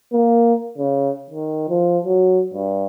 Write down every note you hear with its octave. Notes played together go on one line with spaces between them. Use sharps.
A#3
C#3
D#3
F3
F#3
G2